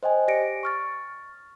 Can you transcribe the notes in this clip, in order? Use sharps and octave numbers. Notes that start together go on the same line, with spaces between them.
C5 D#5 G5 G#5
G4 D5 A#6 C#7 D7
C#6 F6 A6